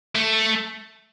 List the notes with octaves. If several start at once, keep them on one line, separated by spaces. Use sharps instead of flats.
A3